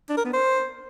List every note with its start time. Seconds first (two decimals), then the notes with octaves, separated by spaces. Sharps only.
0.09 D4
0.17 A#4
0.25 B3
0.33 C5